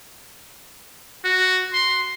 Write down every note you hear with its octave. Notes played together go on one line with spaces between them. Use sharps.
F#4
C6